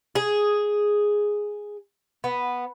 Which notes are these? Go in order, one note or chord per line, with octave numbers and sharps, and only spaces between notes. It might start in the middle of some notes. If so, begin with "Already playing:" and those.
G#4
B3